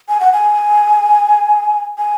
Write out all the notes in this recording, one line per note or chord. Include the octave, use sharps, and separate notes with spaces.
G#5
F#5
G#5
G#5